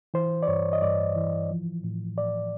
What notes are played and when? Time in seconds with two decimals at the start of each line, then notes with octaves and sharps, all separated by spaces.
0.14 E3 C5
0.43 D5
0.48 G2 C#5
0.73 D#5
0.82 G2 D5
1.16 E3
1.51 F3
1.84 A2
2.18 A2 D5